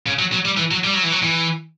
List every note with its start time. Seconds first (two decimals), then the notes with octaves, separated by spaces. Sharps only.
0.07 C#3
0.19 F#3
0.32 F#3
0.45 G3
0.57 E3
0.71 F#3
0.84 G3
0.94 F#3
1.03 E3
1.12 F#3
1.22 E3